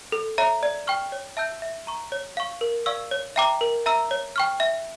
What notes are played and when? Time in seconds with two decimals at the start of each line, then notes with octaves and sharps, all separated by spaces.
0.12 A4
0.38 C#5 E5 A#5
0.63 D5
0.87 G5 C#6 F6
1.12 C#5
1.37 E5 A5 E6 G6
1.62 E5
1.87 A#5 C#6
2.12 C#5
2.37 F5 C#6
2.61 A#4
2.86 D5 F5 C#6 E6
3.11 C#5
3.36 E5 G5 A#5 D6
3.61 A#4
3.86 E5 A#5 E6
4.11 C#5
4.36 G5 C#6 F6
4.60 E5